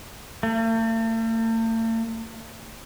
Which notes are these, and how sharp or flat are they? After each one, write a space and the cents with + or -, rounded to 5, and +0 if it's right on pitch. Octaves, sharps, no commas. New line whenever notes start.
A3 +45